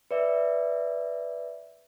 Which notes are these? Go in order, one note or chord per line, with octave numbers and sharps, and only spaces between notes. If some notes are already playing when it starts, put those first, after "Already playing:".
B4 D5 E5